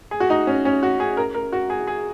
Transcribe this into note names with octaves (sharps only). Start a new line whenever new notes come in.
G#4
F#4
D#4
C#4
C#4
F#4
G#4
A#4
A#4
F#4
G#4
G#4